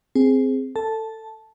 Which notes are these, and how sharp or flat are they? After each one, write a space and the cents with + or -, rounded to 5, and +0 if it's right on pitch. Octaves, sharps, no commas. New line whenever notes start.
C4 -5 G#4 +0
A4 +20 A5 -5